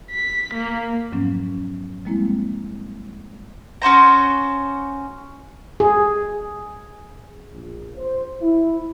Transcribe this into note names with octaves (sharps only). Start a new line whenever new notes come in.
B6
A#3
F2 G#2 F3 F#3 B3 C#4
F3 G3 G#3 A#3 C4 E4
C#4 F#4 C5 A#5
G#4
A#1
C5
E4